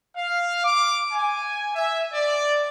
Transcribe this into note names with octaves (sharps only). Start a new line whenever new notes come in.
F5
D6
G#5
E5
D5